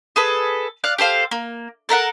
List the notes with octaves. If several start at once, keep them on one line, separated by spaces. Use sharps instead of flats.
G#4 A4 B4
D5 F5 F#6
G4 A4 C5 F5
A#3
A4 A#4 E5 F#5